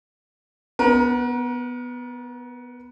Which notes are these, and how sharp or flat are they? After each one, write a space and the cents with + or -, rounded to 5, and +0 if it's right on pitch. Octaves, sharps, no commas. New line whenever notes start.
B3 +0 A#4 +35